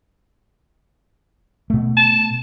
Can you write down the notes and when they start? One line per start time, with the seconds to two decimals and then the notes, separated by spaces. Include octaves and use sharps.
1.70 B2 A3
1.96 A5